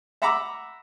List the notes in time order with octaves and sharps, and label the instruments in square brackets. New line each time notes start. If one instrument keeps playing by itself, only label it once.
[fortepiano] E5 F#5 A#5 B5 D6 E6